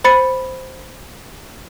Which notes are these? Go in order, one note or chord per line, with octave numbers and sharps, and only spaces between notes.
C5 B5 A6 C#7